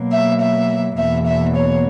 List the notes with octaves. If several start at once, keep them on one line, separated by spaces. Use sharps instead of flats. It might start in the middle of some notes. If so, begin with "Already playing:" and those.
Already playing: B2 F#3 A#3
E5
E5
E2 B2 A#3 E5
E5
C#5